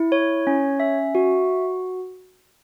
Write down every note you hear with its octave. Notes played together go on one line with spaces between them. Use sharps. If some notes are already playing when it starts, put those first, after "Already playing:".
Already playing: E4
C#5
C#4
E5
F#4